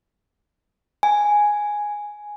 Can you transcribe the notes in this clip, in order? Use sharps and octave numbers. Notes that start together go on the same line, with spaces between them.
G#5